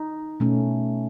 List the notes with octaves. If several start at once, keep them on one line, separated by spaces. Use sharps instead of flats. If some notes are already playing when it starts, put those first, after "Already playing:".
Already playing: D#4
B2 A3 C#4